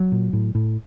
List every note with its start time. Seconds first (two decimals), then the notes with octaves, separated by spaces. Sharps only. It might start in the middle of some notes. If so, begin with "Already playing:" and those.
Already playing: F#3
0.12 A#2
0.33 A2
0.55 A2